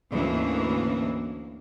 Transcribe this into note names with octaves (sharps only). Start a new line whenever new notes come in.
D2 G#2 E3 A#3 C#4